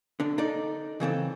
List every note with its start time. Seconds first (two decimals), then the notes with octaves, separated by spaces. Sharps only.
0.20 D3 D4
0.38 D#4 A4 D5
1.00 C#3 E3 C4 A4